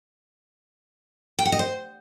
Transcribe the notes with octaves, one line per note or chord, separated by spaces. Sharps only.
G5
F#5
D#5
C5